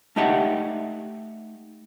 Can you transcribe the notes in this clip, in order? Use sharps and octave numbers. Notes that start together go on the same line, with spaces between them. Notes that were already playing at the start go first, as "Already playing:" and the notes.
A3 D#4 G4 D5 E5 F#5